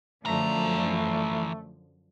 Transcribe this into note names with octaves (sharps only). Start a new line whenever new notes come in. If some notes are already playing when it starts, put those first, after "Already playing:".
F#2 D3 E3 F3 A3 A#5